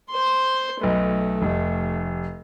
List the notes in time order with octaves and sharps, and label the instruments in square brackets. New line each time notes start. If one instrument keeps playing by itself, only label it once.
[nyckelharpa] C5 C6
[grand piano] B1 B4 [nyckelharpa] A3
[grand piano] F1